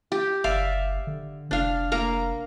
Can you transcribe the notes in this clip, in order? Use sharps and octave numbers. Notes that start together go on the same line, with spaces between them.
G4
F#1 D5 E5 F5
D3
F1 D4 F5
A#3 F5 A#5